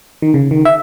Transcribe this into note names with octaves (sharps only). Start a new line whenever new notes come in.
D#3
C#3
D#3
E5